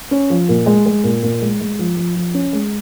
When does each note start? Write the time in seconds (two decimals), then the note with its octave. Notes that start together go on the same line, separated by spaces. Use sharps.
0.11 C#4
0.30 F3
0.49 A#2
0.66 G#3
0.86 G#3
1.04 A#2
1.23 A#2
1.42 G#3
1.61 G#3
1.79 F3
1.97 F3
2.15 F3
2.34 C#4
2.53 G#3